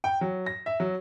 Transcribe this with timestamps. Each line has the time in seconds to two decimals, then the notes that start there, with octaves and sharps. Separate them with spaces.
0.04 G5
0.21 F#3
0.46 A#6
0.66 E5
0.80 F#3